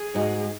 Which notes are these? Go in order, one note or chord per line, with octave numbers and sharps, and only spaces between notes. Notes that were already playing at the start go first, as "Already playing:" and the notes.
Already playing: G#4
G#2 G#3 D#4 F#4 D#5